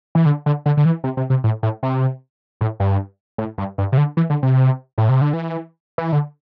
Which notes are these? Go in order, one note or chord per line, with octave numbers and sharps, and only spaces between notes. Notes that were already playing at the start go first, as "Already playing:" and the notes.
E3
D3
D3
D3
D3
E3
C3
C3
C3
A2
A2
C3
A2
G2
A2
G2
G2
C3
D3
E3
D3
C3
A2
C3
D3
E3
E3
D3